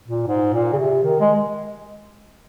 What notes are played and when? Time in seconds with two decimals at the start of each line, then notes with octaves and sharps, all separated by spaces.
0.08 A#2
0.27 G#2
0.53 A#2
0.73 C#3
0.78 C3
1.03 D#3
1.20 G#3